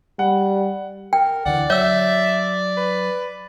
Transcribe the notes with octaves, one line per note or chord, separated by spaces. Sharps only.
G3 F#5
A#4 G5
D2 D3 E3 D5 F#5
F#3 C#5 E5 E6
B4